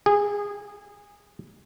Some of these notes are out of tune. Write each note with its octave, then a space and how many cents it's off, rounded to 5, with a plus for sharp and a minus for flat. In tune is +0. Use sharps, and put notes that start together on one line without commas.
G#4 -20